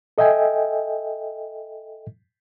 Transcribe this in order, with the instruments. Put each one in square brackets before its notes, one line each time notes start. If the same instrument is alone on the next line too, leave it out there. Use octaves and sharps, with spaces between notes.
[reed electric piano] A4 D#5 E5 G5 G#5